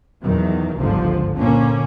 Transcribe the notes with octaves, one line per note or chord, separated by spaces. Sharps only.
E2 D#3 F#3
G1 C#2 G#2 D3 F3
A#2 D3 A#3 C#4